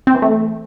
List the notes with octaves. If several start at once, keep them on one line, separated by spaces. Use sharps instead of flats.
C4
E3
A3